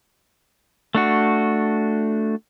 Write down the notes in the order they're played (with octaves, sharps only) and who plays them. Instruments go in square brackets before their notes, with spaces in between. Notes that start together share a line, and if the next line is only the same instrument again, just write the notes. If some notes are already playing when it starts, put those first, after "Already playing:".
[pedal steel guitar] A3 D4 F#4